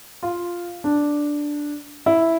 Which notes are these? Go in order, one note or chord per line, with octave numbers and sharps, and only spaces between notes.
F4
D4
E4